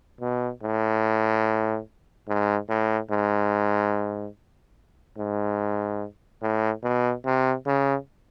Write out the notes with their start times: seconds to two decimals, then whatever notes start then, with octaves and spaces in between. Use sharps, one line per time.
0.21 B2
0.63 A2
2.28 G#2
2.69 A2
3.11 G#2
5.18 G#2
6.42 A2
6.84 B2
7.25 C3
7.67 C#3